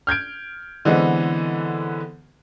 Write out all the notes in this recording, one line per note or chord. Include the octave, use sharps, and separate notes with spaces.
F6 G6 G#6 D7
D3 E3 G#3 B3 C4